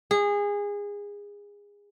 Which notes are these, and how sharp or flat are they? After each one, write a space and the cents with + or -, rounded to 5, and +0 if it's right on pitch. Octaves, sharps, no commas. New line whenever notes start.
G#4 -25